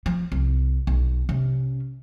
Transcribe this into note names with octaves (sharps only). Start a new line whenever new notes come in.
F3
C2
B1
C3 C#4